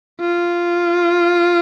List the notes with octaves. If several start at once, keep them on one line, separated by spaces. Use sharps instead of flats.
F4